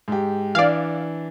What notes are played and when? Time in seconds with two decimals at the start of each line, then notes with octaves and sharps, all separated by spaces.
0.08 G#2 G4
0.55 E3 D4 D5 F5